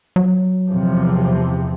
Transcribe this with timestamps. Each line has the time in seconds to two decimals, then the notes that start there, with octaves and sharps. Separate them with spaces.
0.16 F#3
0.68 E2 C3 F3